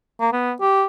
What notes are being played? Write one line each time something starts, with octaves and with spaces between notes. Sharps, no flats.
A#3
B3
G4